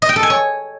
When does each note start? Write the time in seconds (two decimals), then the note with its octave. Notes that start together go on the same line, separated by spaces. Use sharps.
0.02 D#5
0.09 G5
0.16 A4
0.23 G#5
0.30 C#5